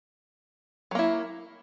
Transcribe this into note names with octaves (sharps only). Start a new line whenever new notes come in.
F#3 A#3 E4